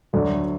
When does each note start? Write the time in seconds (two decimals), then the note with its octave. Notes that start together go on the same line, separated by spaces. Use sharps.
0.13 D2 D3 F#3 A3 D4